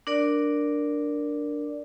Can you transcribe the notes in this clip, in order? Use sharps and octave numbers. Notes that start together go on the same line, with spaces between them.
D4 A#4 D5